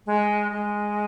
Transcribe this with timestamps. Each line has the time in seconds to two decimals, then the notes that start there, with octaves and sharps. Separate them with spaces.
0.06 G#3
0.51 G#3